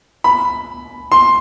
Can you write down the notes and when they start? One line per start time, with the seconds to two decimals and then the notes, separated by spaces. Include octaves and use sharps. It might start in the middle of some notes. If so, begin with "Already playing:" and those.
0.24 B5
1.12 C6